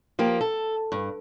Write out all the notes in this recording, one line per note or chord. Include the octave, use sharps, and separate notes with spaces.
F3 A#3 G4
A4
G2